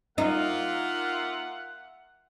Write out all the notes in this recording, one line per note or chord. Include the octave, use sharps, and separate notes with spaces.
A#3 D#4 F4 E5 F#5